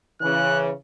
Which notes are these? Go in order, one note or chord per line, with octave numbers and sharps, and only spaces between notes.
C#3 E3 F#6